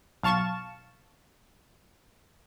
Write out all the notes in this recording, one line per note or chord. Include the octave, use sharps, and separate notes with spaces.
B1 F5 A5 C#6 E7